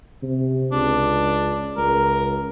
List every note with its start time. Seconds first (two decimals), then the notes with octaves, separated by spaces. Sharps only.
0.23 C3
0.72 C#2 D4
1.77 C#2 A#4